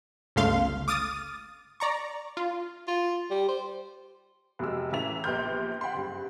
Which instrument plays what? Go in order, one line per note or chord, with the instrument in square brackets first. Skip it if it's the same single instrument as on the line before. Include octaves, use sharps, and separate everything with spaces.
[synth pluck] G1 C#2 A3 F5 C6
D6 D#6 F6 A6 D#7
D5 A#5 C#6
F4
[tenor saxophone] F4
G3
C5
[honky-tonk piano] F1 C3 F#3 G#3 E6
A2 C#3 E3 E5 A#5 F7
A#1 B3 G4 C6 F6 G6
F#5 G5 B5 C6
F#1 G2